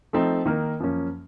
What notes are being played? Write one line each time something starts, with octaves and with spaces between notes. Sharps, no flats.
F3 A3 C4 D#4
D#3 A#3 D#4 A#4
F#2 F3 A#3 C#4